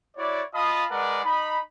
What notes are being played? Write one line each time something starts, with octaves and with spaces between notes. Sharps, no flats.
E4 F#4 C#5 D5
F4 D#5 F5 A5 B5 D#6
G#3 A#4 B4 D5 F#5
D#4 B5